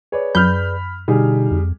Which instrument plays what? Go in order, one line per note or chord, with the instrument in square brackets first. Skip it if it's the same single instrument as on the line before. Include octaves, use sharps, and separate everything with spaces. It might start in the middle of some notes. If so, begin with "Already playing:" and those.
[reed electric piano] G#4 B4 D5 [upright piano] C#5
[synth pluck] F#2 G6 [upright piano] B5 F6
[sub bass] B2 [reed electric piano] D3 D#4 F#4 [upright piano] G3 G#4
[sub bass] F2